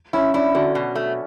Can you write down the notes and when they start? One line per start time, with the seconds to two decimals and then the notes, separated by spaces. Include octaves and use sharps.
0.13 C#4 E4
0.34 D4 E4
0.55 D3 D4 F#4
0.75 B2
0.95 A3